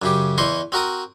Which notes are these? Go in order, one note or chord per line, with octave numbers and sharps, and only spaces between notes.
F#2 C#3 G4
E2 E3 C5 D#5 C6 C#6
C4 F#4 A#4 D#6